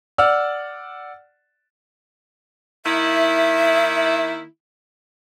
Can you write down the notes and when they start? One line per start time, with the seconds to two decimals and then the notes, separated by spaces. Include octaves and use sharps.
0.18 D5 F#5 E6 F6
2.86 D#3 A#3 E4 E5